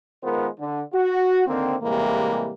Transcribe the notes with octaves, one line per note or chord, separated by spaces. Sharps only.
D#3 G#3 B3 F4 A#4 C5
D3
F#4
D3 D#3 A#3 C4
A2 C3 E3 G3 G#3 A#3